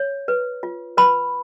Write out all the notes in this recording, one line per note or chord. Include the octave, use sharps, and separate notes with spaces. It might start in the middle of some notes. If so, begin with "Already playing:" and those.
Already playing: C#5
B4
F4
B4 B5